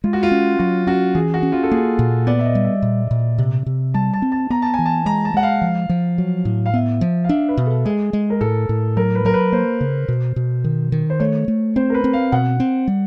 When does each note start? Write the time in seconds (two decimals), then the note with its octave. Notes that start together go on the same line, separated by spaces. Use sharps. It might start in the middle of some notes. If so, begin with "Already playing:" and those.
0.04 G#3 F4
0.13 F#4
0.23 F4
0.31 C#4
0.59 F#3 F#4
0.87 C#4 F#4
1.15 E3 G#4
1.34 F#4
1.43 C#4
1.52 F4
1.63 A4
1.71 A#3 G#4
1.99 A#2
2.27 B3 D5
2.39 E5
2.46 D#5
2.55 G3
2.64 E5
2.82 A#2
3.11 A#2
3.38 C3
3.66 C3
3.94 G3 A5
4.13 A5
4.22 C4
4.32 A5
4.50 B3 A#5
4.62 A5
4.74 G#5
4.79 E3
4.86 A5
5.06 G#3 A#5
5.25 A5
5.34 G#3 F#5
5.43 F5
5.62 F3
5.89 F3
6.18 F#3
6.45 A2
6.66 F5
6.74 B3 E5
7.01 F3
7.24 F5
7.29 D4 E5
7.48 B4
7.57 B2
7.66 A4
7.85 G#3 G#4
8.13 G#3
8.30 A#4
8.41 A2 A4
8.69 A2
8.97 F#3 A#4
9.15 B4
9.25 F#3 A#4
9.34 B4
9.52 A#3 C5
9.81 C#3
10.08 B2
10.36 B2
10.64 D#3
10.92 D#3
11.10 C5
11.20 A3 C#5
11.48 A3
11.76 C4 C5
11.90 A#4
11.94 B4
12.04 C4
12.13 F5
12.32 B2 F#5
12.60 C4
12.88 G3